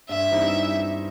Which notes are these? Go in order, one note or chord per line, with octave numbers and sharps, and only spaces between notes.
G2 E5
E3 G3 C4 D#4